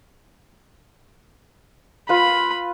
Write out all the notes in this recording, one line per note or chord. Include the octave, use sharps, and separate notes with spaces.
F4 B4 B5